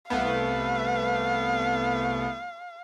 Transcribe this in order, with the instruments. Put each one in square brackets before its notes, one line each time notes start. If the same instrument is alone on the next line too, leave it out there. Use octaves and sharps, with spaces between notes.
[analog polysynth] C2 A3 B3 [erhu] F5